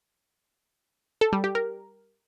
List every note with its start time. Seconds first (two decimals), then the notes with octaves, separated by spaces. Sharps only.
1.21 A4
1.33 G3
1.44 G4
1.55 A#4